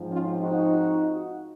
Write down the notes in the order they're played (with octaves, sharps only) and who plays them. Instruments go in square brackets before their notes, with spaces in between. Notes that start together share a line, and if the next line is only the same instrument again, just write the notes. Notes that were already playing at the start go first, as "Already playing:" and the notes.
Already playing: [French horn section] G#2 F3 C4
C#4 F4
D#4 F#4